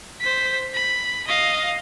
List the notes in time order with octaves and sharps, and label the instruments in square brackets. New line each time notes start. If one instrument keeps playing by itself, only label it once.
[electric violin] C5 B6
B5
D#5 F5